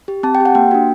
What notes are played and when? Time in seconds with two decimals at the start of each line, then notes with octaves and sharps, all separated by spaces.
0.08 G4
0.23 C4 A5
0.35 G5
0.40 G4
0.45 F#5
0.55 A#3 G5
0.71 D4 F#4